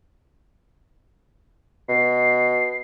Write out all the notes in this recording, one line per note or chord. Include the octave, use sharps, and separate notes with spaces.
B2 C7